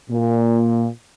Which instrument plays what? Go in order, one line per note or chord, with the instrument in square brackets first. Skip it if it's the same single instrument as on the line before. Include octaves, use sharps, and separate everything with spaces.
[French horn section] A#2